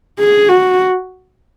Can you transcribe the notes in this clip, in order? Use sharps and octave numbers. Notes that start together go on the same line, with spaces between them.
G#4
F#4